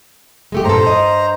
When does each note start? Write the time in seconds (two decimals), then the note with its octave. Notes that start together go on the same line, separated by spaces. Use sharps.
0.52 G#3 A3 G4
0.65 G2 A#2 A4 C5 A#5
0.84 G2 D#5